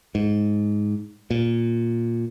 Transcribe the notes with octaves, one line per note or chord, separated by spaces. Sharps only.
G#2
A#2